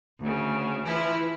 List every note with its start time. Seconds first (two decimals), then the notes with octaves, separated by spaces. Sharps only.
0.19 D2 C#3
0.85 E3 F3 E4